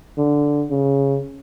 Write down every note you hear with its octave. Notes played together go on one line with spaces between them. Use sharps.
D3
C#3